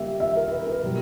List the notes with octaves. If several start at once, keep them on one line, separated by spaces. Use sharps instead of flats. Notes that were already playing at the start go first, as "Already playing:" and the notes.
Already playing: C#3 G3 A#3 C#4 G4 E5
E5
A#4
B4
A#4
B2 G3